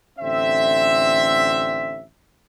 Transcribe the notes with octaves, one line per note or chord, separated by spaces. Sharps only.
A1 D3 C4 E5